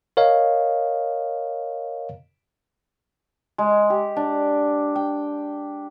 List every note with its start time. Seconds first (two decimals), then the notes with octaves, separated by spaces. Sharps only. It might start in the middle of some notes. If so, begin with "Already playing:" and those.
0.17 A#4 C#5 D#5 F5
3.58 G#3
3.90 G4
4.16 D4
4.96 G5